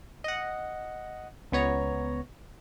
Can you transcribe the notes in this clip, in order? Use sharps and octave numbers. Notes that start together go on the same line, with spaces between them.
D#5 F#5
C#2 B3 C#5 A#5